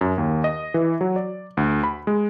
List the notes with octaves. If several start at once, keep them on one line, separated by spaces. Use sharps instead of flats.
F#2
D#2
D#5
E3
F#3
D5
D2
B5
G#3